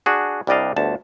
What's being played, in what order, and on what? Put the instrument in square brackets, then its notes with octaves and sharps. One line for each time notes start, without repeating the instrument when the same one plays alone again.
[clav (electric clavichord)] D4 F#4 G#4
C2 G3 D4 D5 D#5 F5
G1 D2 A5